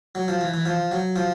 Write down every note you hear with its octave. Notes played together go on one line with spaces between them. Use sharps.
F#3
F3
E3
E3
F3
F#3
F3